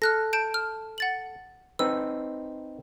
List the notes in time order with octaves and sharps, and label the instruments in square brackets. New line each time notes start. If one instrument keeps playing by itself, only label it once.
[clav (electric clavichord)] A4 [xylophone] F6 F#6 A#6
[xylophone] A5 G6 D7
F6
F#5 A6 F#7
[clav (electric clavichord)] C4 D#4 B4 [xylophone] E6